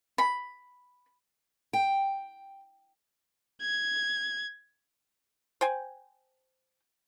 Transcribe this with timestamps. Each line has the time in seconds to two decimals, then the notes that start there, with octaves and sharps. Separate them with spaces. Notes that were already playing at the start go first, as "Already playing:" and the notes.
0.18 B5
1.73 G5
3.62 G#6
5.61 C5 G5 G#5